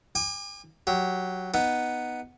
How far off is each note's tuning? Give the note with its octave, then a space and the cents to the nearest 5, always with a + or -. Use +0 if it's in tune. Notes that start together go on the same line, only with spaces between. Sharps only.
G#5 -40 D6 +25
F#3 +0 G4 -10
B3 +0 D#4 +0